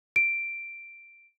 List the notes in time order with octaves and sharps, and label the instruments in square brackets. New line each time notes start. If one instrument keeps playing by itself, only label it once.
[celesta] D7